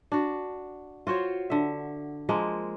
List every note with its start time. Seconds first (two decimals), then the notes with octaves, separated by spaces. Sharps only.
0.12 D4 F#4
1.07 F4 F#4 C5 C#5
1.50 D3 E5
2.29 F3 G#3 A#3